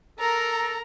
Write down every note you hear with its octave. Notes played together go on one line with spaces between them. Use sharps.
A4 A#4 A#5